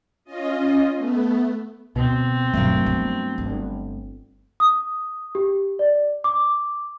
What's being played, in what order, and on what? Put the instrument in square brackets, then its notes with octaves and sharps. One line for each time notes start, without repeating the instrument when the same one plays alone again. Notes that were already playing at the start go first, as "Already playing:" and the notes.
[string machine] C#4 F4 D#5
A3 B3
[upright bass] D2 [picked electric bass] B2 [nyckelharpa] C4
[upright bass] D#1 B2 [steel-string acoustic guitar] G2 F#3 A#4 [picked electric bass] A3
[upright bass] F3 B3
G1
[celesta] D#6
G4
D5
D6